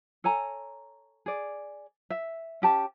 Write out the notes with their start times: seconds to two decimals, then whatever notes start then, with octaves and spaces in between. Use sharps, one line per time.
0.24 A4 C#5 G#5 A#5
1.26 G#4 D5
2.10 E5
2.62 C#4 G4 A5